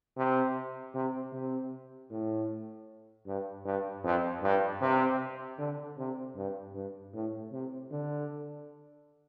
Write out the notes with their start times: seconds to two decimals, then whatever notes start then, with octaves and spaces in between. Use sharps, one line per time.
0.17 C3
0.94 C3
1.33 C3
2.11 A2
3.27 G2
3.65 G2
4.04 F2
4.43 G2
4.81 C3
5.59 D3
5.98 C3
6.36 G2
6.75 G2
7.14 A2
7.52 C3
7.91 D3